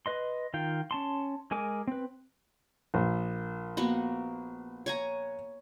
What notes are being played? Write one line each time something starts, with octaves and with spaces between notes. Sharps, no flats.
B4 D#5 C6
D#3 F4 F5 G5
C#4 A5 C6
G#3 G#4 A#4 G#5 D6
C4 B4
A#1
A#3 B3 F#4
C#5 G#5 A#5